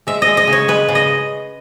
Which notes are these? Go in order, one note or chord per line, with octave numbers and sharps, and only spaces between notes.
G#3 E5
D#5
G#3
D#5
C#3
C#5
G#3 B4
C#3
D#5